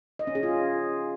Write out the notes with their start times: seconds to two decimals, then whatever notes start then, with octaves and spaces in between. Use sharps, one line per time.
0.19 D#5
0.27 C#4
0.35 G#4
0.43 F4